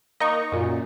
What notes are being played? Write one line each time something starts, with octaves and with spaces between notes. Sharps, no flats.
A#3 D#4 D#5 C#6
F#2 A#2